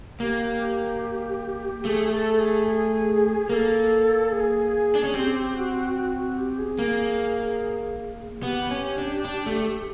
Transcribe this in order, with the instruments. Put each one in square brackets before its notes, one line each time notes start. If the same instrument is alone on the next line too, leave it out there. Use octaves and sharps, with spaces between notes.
[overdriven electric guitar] A#3 [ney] G4
[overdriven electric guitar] A3 [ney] G#4
[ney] A4
G#4
G#4
[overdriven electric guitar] A#3 [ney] A4 A#4
[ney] G#4
[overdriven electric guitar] D4
C#4
[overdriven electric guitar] C4 [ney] G4
[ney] F#4
F#4
F#4
G4
G#4
[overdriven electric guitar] A#3
[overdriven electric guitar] B3 [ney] G4
[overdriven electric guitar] C#4
D4
D4
A3